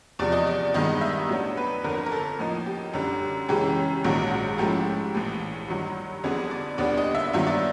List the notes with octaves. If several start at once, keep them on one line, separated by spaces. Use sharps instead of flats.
E2 C3 F3 D5
D#5
D5
G2 D#3 G#3 B3 D#4 D#5
E5
A2 F#3 B3 D4
B4
G1 F2 D3 A#4
A#4
A4
A2 F3 A#3 D#4
G4
F#2 D3 G3
F#2 C#3 E3 G#3 C#4 G4
A#1 G#2 D#3 F#3 F#4
F#4
G#2 F3 A3 C#4 E4 G4
A#1 A2 E3
G2 D#3 F#3
F2 D3 G3 B3 D4 G#4
D5
D#2 D3 G3 B3 D4 D5
D#5
E5
G2 D#3 F#3 B3 E5
D5